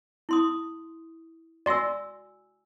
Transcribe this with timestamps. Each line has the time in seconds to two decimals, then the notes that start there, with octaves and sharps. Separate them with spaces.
0.29 E4 C6 D#6
1.66 F#4 D5 G#5 C6 E6 A#6